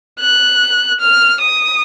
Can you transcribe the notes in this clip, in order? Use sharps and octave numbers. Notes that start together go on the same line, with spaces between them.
F#6
F6
D#6